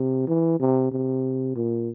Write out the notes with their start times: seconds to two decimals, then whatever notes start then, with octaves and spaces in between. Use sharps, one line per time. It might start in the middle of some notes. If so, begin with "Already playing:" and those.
Already playing: C3
0.28 E3
0.60 C3
0.92 C3
1.56 A#2